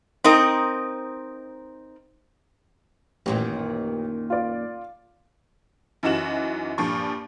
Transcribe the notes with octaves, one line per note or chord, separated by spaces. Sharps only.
C4 D#4 A#4 D#5
A1 F#2 A#2 D#3
F4 D5
F#2 E3 D#4 F#4 E7 F#7
G2 A#2 F3 C#6